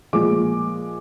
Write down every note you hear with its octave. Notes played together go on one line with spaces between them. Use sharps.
A#2 F3 G#3 D6